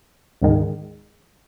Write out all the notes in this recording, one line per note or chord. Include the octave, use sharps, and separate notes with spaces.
D2 G#2 D#3 G#3